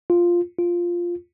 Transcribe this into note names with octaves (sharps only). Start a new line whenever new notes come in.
F4
F4